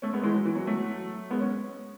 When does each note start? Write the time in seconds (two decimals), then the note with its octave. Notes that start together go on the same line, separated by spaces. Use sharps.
0.02 A3 C#4
0.13 G#3 B3
0.23 E3 G#3
0.34 F#3
0.45 E3
0.55 F#3
0.66 F#3 A3
1.31 G#3 B3
1.41 C#4